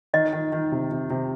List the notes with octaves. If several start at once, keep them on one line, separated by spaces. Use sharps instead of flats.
D#3 D#5
D#3
D#3
C3
C3
C3